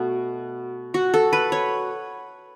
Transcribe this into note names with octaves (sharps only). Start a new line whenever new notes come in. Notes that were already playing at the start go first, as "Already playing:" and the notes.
Already playing: B2 A3 F#4
F#4
A4
B4
C#5